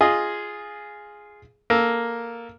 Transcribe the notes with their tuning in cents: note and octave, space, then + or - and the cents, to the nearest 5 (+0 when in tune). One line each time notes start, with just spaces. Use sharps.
F4 +0 G#4 +0 D#5 +0
A#3 +0 A4 +0